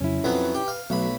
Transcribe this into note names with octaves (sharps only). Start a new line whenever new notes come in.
F2 C#3 F#3 C#4 E4
F2 F#3 B3 B4
G4
F5
B1 F#3 A3 B3 B5